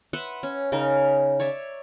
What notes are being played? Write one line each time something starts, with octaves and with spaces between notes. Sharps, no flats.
B4 E5 F#5 C6
C#4
C#3 D#4 A#4
C#5 D5 E5